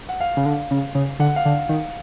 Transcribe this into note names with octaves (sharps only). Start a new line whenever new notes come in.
F#5
F5
C#3
D3
C#3
C#3
D3 F#5
F5
D3
D#3